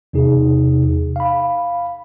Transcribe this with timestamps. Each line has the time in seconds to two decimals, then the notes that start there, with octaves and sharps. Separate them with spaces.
0.13 E2 C3 D#4 G#4
1.16 F5 B5